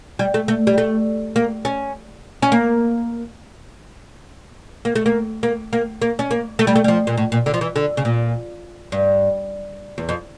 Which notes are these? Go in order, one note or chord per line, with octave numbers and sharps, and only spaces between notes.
G3
A3
A3
G3
A3
A#3
C#4
C#4
A#3
A#3
A3
A#3
A#3
A#3
A#3
C#4
A#3
A3
G3
A3
G3
F3
A#2
A2
A#2
D3
F3
E3
D3
C#3
A#2
G2
E2
F2